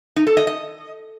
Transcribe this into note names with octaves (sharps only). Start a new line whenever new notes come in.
D#4
A4
D#5
D#5